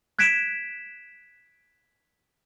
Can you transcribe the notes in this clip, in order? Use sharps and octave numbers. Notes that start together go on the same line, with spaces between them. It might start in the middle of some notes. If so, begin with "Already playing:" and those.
F#6 G#6 B6 D7 E7